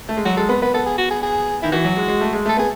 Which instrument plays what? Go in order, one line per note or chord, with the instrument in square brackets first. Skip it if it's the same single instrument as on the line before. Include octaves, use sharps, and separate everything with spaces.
[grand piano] A3
G#3
[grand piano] F#3 [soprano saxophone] F#4
[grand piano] G#3 [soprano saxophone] A4
[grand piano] B3 [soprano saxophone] B4
[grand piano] B3 [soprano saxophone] B4
[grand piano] B3 [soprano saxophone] A4
[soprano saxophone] G#4
F#4
G#4
G#4
[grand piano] D#3 [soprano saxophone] E4
[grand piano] E3 [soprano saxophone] F#4
[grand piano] F#3
G#3
G#3
A3
G#3
[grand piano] A3 [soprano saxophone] A4
[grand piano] B3 [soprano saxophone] G#4